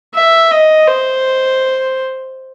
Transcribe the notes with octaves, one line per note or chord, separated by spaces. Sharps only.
E5
D#5
C5